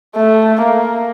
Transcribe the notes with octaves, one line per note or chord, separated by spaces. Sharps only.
A3
A#3